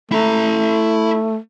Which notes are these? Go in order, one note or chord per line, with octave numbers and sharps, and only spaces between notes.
A3 E4 A#5